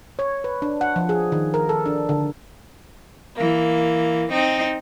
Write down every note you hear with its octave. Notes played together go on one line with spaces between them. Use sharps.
C#5
B4
D4
F#5
F3
G#4
D#3
A#4
A4
D4
D3
E3 A#3
C4 D#4